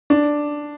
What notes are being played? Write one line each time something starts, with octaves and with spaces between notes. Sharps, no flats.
D4